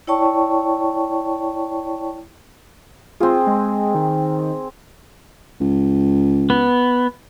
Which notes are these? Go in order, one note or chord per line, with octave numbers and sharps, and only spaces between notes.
E4 C#5 D5 G5 A5 C#6
C4 F4 G#4
G#3
D#3
C#2
B3